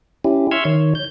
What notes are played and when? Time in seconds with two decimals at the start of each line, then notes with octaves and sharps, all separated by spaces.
0.25 C#4 E4 G4
0.51 E5 C6 C#6 E6 F6 G#6
0.65 D#3 C#5
0.95 G6